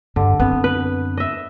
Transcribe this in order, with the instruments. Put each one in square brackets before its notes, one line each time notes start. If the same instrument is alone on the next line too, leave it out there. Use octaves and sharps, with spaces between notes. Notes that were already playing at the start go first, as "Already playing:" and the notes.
[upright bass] G2 [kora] D3
[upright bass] F#2 C4 [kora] B3
[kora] B4
D#5 E5